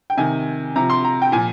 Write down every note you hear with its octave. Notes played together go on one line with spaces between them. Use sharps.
G5
C3 D#3 G#5
C3 F3 A#5
C6
A#5
G5
A#2 F3 G#5